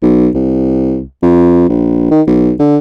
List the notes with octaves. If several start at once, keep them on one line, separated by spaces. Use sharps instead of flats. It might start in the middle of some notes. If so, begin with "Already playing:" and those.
B1
C2
F2
A#1
D#3
B1
D3